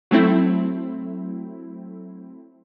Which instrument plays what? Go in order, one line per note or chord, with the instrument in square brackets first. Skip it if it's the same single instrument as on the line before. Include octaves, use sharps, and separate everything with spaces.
[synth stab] F#3 A3 C4 E4